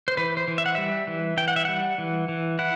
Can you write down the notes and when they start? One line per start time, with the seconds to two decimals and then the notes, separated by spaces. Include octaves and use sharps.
0.08 C5
0.17 E3 B4
0.37 C5
0.48 E3
0.58 E5
0.66 F#5
0.75 G3 E5
1.07 E3
1.37 E3 G5
1.48 F#5
1.56 E5
1.65 G3 F#5
1.98 E3
2.29 E3
2.59 E4 F#5